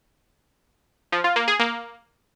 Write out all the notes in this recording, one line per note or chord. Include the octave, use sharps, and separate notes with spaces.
F3
F4
A#3
G#4
A#3